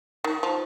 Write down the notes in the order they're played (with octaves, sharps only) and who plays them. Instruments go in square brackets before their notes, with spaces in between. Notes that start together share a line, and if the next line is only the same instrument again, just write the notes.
[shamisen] D#3
F3